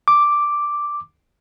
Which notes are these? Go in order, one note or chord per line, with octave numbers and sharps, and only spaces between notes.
D6